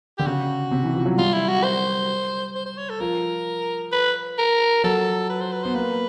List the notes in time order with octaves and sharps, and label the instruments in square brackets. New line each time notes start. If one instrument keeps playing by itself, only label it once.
[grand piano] D3 [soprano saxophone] G4
[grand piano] C#3 [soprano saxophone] F#4
[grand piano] C3
E3
F3
F#3
[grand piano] G3 [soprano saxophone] F4
[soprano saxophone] E4
F#4
C5
C5
C5
C#5
A4
[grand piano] F3 [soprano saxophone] A#4
[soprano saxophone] B4
A#4
[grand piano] F#3 [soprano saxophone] A4
[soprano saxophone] B4
C5
B4
[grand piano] B3 [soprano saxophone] C5
[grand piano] A#3 [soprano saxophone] B4